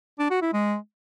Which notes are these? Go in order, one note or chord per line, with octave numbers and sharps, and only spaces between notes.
D4
F#4
E4
G#3